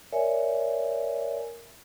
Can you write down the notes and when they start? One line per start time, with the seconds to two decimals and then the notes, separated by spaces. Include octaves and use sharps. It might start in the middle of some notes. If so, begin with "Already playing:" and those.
0.12 A#4 C#5 D5 E5 G#5